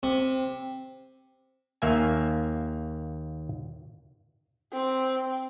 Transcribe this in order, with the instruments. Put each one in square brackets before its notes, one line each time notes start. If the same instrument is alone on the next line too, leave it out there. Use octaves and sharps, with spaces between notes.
[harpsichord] C3
[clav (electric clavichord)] D#2 A#3 E5 G#5
[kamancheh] C4